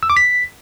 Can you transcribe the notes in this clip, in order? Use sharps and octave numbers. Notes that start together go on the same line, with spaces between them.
E6
D6
B6